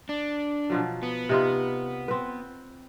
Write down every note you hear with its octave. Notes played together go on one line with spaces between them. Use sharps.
D4
B2 F3 F#3
B3
C3 D#4 F4
C4 B4